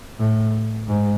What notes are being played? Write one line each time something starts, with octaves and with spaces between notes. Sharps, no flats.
A2
G#2